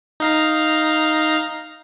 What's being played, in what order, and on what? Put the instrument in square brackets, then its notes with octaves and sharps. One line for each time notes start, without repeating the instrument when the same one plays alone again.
[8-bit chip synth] D#4 F5 A#5